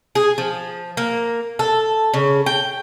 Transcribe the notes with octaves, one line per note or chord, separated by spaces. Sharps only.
G#4
F3
A#3
A4
C#3
G5